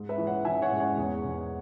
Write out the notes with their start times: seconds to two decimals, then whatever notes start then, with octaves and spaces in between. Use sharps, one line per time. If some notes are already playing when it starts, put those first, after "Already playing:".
Already playing: G#2
0.09 B4 E5
0.18 E3
0.27 C#5 F#5
0.45 E3 E5 G#5
0.62 C#5 F#5
0.71 G#2
0.80 C#5 F#5
0.98 E2
1.24 E2